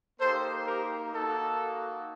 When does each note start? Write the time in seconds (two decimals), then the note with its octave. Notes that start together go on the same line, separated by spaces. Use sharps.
0.20 A#3 D#4 G4 A4 C5
0.67 G4 A#4
1.14 A#3 D#4 F#4 A4